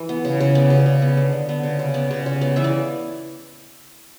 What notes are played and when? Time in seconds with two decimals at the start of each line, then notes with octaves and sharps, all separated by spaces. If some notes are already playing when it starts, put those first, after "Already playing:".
Already playing: E3
0.09 B3
0.25 C#3
0.40 C#3
0.55 B3 D5
0.70 C#3
0.86 C#3
1.02 B3
1.17 D3
1.33 D3
1.49 B3
1.63 C#3
1.79 C#3
1.94 B3 D5
2.11 C#3
2.26 C#3
2.41 B3 D5
2.56 E3 E5
2.64 D5